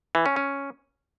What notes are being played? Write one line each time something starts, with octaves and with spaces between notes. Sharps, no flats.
E3
C#4
C#4